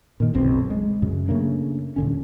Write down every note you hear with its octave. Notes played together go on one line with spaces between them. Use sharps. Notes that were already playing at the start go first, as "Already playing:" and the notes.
A#2 D#3
F#1 B1 C4
G#3
F#2 C#3
C#3 A3 A#3 D4
D#1 D3 C#4